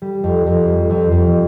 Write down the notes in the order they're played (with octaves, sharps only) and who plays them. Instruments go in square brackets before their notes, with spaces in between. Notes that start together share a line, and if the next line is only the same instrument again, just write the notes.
[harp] G3
F2
F2
G3
F2
F2